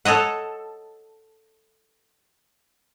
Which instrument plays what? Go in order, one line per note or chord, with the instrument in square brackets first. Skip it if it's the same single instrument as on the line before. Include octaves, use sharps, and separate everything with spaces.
[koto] A4 C#5 D#5 F#5